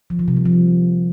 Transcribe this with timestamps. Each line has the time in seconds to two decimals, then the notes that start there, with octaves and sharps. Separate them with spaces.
0.10 F3
0.19 D#3
0.28 C3
0.37 G3
0.45 F3